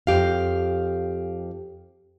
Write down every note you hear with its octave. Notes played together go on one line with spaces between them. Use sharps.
F2 G4 F5